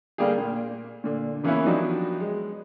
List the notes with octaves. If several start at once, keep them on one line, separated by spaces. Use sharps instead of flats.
D3 G3 A#3 D4 G4 G#4
A#2
A#2 D3
C#3 E3 A#3 B3 C#4 E4
F3 F#3 B3 D4 D#4 G4
G#3